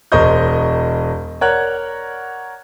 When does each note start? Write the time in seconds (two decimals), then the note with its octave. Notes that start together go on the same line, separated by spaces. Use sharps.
0.12 E1 A#4 C5 D#5 C#6 G6
1.41 A#4 C#5 D5 F#5 F#6